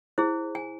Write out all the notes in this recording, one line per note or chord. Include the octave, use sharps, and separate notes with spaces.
E4 G#4 C5
G#5